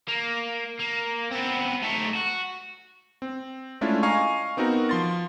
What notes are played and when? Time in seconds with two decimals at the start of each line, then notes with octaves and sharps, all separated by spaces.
0.08 A#3
0.80 A#3
1.32 B3 C4
1.83 A3 D#4
2.16 F#4
3.22 C4
3.81 G#3 A3 C#4 D4 E4 F4
4.03 D#5 F5 G#5 A#5 C#6
4.57 B3 C4 D#4 F#4 A#4
4.89 F3 C6 A6